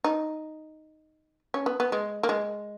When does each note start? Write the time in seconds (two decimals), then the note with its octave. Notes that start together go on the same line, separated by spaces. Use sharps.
0.04 D#4
1.54 C#4
1.66 B3
1.80 B3
1.92 G#3
2.23 A#3
2.29 G#3